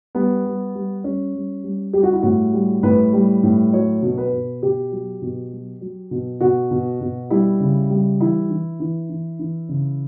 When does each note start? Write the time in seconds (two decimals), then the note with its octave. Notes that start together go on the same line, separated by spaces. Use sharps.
0.15 G3 B3
0.45 G3
0.75 G3
1.04 G3 C#4
1.34 G3
1.64 G3
1.93 G3 G4
2.03 F#4
2.13 E4
2.22 A2 F#4
2.53 G3
2.83 A2 B4
3.13 G3
3.43 A2
3.73 F#3 C#5
4.02 B2
4.18 B4
4.32 B2
4.63 B2 G4
4.92 F#3
5.22 B2
5.52 F#3
5.81 F#3
6.11 B2
6.41 B2 F#4
6.71 B2
7.01 B2
7.30 G3 E4
7.60 C#3
7.90 G3
8.20 E3 E4
8.50 E3
8.80 E3
9.10 E3
9.39 E3
9.69 C#3